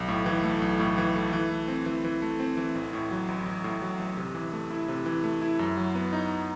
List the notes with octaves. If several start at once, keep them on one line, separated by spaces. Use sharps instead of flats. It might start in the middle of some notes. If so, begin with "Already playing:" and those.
Already playing: B1
A2
E3
A3
B1
A2
E3
A3
E3
A3
C4
E3
E3
A3
C4
E3
A1
A2
F#3
A1
A1
A2
F#3
A1
C3
E3
A3
E4
C3
E3
A3
E4
F#2
F#3
B3
D#4